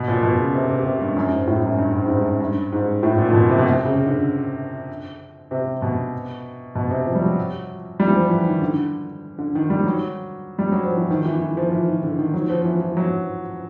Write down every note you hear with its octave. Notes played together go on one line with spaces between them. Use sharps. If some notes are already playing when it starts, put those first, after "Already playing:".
Already playing: B2
A#2
B2
C#3
C3
C3
C3
G2
F#2
G#2
A2
F#2
G2
G#2
G#2
G2
G2
G#2
A2
A#2
A#2
B2
C3
B2
C3
C#3
D3
C3
B2
B2
C3
F3
G3
F#3
G3
E3
F3
E3
D#3
D3
D3
D#3
G3
F#3
G3
F#3
F3
E3
D#3
E3
E3
F3
E3
D#3
D3
D#3
F#3
F3
E3
F3
F#3